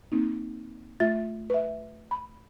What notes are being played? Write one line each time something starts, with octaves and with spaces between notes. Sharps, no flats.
A#3 C4 D#4
A3 F4 E5 A6
B4 E5
B5